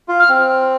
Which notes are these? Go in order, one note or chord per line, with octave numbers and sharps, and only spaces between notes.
F4
F6
C4